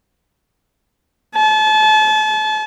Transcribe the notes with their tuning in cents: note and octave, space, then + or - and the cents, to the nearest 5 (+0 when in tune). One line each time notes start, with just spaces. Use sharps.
A5 -35